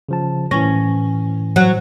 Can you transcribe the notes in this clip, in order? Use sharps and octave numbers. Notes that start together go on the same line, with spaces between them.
C#3 F3 A5
A2 E3 C#4 A#6
F#3